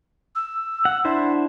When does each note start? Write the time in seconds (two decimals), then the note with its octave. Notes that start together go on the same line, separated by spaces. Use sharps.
0.35 E6
0.85 F#5
1.05 D4 E4 C5 F#5